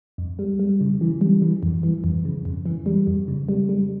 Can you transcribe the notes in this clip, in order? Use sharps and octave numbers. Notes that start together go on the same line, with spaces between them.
F2
G3
G3
C#3
E3
G3
E3
F2
E3
F2
C#3
F2
E3
G3
F2
C#3
G3
G3